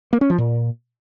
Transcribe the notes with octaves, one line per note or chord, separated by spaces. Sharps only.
A#3
C#4
F3
A#2